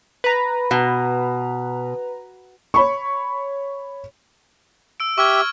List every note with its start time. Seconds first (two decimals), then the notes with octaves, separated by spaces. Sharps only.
0.24 B4 A#5
0.71 B2
2.74 C#5 B5 C#6
5.00 E6 D7
5.18 G4 E5 C#6 F6 G#6